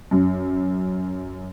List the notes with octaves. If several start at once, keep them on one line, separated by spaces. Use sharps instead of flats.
F#2